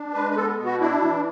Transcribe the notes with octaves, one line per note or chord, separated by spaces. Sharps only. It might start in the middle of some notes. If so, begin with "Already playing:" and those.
Already playing: D4
G#3 B4
B4
B3 A4
B2
F#4
D4 E4
E3